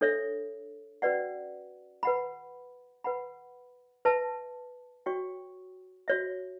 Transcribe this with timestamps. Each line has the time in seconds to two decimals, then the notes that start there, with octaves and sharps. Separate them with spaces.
0.01 D4 A4 C#5 E5
1.02 C#4 F#4 B4 D5 F#5
2.03 B4 F#5 B5
3.04 B4 F#5 B5
4.05 B4 E5 A5
5.06 F#4 C#5 G5 C#6
6.08 F#4 C#5 E5